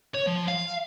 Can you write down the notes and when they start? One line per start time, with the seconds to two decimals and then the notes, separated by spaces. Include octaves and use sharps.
0.14 C#5
0.26 F3
0.48 F5